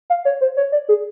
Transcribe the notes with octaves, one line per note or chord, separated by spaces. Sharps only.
F5
C#5
C5
C#5
D5
G#4